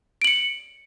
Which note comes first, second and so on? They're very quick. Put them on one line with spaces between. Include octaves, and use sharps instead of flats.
D7 F#7 C#7